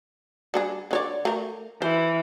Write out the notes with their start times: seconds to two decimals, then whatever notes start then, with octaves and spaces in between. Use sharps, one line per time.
0.54 G3 D4 G#4
0.91 D3 C#5 D5
1.25 A3 A#4
1.82 E3 C5